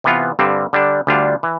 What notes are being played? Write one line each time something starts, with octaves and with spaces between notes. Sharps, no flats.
C3 E3 B3 F4
G2 D3 G3 C4
D3 G3 D4
D2 D3 G3 D4 F4
E3